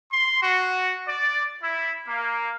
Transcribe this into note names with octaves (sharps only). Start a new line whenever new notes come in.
C6
F#4
D5
E4
A#3